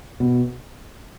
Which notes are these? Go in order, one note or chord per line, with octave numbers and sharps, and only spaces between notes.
B2